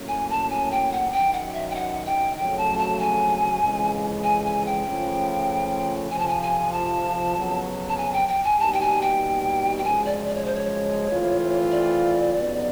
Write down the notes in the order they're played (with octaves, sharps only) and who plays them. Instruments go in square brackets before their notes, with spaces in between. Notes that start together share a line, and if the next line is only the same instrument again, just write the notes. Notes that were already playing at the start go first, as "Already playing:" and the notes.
Already playing: [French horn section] A2 F#3 A#3 C#4
[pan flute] G#5
A5
G#5
G5
F#5
[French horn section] F#2 D#3 F#3 [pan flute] G5
[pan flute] F#5
E5
G5
F#5
G5
[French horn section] F2 C#3 F#3 A3 [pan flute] G5
[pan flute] A5
A5
G#5
[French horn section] F2 C#3 E3 G#3
[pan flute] G#5
G#5
G5
[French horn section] C#3 F3 A3 C#4 F4
[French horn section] F2 C3 F3 [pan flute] G#5
[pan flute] A5
G#5
G#5
A5
[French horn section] F2 C#3 F#3 B3
[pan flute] A5
G#5
G5
G5
G#5
[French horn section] B2 G3 A#3 D#4 G4 [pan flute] A5
[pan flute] G5
G#5
G5
G5
[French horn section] F#2 C#3 F3 G#3 [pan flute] G#5
[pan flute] D5
D5
C#5
C5
C#5
[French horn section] E3 A3 C4 F4
[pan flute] D5
[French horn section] F2 C#3 F#3 B3 D#4